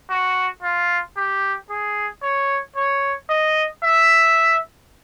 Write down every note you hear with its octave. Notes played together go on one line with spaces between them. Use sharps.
F#4
F4
G4
G#4
C#5
C#5
D#5
E5